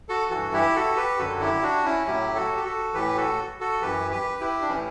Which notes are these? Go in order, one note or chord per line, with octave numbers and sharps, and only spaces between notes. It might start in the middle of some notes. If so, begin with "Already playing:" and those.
F#4 A4
G2 E3 F#4 A4
E4 G4
F#4 A4
G4 B4
F#2 D3 F#3 F#4 A4
E4 G4
D4 F#4
C#4 E4
A2 F#3 E4 G4
F#4 A4
G4
F#4 A4
A2 E3 G4 B4
F#4 A4
F#4 A4
F#2 E3 G4 B4
G4 B4
E4 G4
D4
A2 E3 C#4 E4